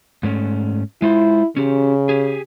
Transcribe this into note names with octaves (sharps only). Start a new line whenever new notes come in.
G#2 A3 C#4
G#3 E4 F4 C5
C#3 C#4 G4
G4 G#4